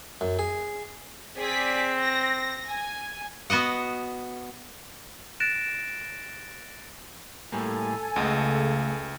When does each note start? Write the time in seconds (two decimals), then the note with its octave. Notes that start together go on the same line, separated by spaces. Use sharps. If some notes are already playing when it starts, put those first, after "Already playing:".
0.21 F#2
0.39 G#4
1.37 C4 G#4 D5 B6
1.99 A#6
2.67 G#5
3.50 B3 F#4 D#5 F#5
5.40 F#6 A6 A#6 D7 E7
7.52 A2 G3 A#3 A4 G#5
8.16 C#2 C#3 A3 D#5 F#5